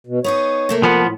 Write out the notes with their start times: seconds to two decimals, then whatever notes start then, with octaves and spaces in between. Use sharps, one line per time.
0.07 B2
0.24 B3 D#4 G#4 C#5
0.69 C3 A3 A#3
0.83 F3 B3
1.02 A2